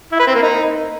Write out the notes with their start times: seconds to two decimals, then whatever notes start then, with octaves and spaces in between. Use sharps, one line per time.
0.12 E4
0.19 B4
0.27 C4
0.35 A#3
0.42 D#4